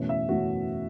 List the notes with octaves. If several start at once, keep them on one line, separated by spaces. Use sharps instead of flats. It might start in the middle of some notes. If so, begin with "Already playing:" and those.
Already playing: F#1 E2 B2 A3 C#4
E5
F#1 E2 B2 A3 C#4 F#4